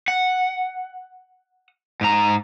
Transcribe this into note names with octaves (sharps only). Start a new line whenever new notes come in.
F#5
G#2 A#5